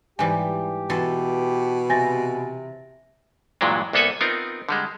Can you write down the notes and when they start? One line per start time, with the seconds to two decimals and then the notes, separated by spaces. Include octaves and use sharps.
0.19 G#2 E3 G3 G4 G#5
0.90 B2 E3 A4 C6
1.90 C3 C4 G#5 A6 A#6
3.61 G2 A#2 E3 F#3 G#3 D4
3.93 C2 A#3 B3 A4 F#5 G#5
4.21 B3 C4 D#4 F4 A#4
4.69 D3 G3 G#3